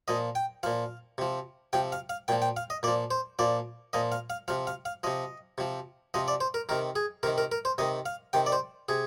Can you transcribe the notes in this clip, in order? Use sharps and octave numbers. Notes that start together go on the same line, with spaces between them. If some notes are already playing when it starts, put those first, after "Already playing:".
A#2 F3 D#5
G5
A#2 F3 F5
C3 F3
C3 F3 G5
F5
F5
A#2 F3 G5
G5
F5
D#5
A#2 F3 D5
C5
A#2 F3 D5
A#2 F3 D#5
F5
F5
C3 F3 F5
F5
F5
C3 F3 D#5
C3 F3
C3 F3 D#5
D5
C5
A#4
C3 D#3 A#4
G#4
C3 D#3 A#4
A#4
A#4
C5
C3 D#3 D#5
F5
C3 D#3 G5
D5
C5
C3 G#4